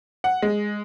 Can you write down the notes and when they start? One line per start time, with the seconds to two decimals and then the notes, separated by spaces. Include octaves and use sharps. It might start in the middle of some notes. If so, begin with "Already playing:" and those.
0.24 F#5
0.42 G#3